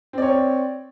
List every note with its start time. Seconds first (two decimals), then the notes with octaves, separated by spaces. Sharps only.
0.13 C4
0.18 D5
0.22 C#5